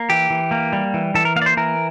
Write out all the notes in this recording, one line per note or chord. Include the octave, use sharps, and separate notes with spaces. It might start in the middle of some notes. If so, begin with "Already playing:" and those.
Already playing: A#3
E3 G4
E3
A#3
G3
E3
E3 A4
A#4
A#3 F5
D5
C5
E3 A#4